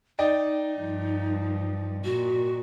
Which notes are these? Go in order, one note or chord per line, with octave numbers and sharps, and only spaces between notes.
D#4 D5 D#5 G5
G2 F3
A#2 F#4